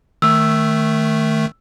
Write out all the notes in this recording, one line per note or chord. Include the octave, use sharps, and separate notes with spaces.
D#3 A3 E6